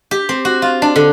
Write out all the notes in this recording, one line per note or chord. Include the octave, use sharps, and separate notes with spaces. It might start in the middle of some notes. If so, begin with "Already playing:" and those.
G4
C4
F#4
F4
D4
D3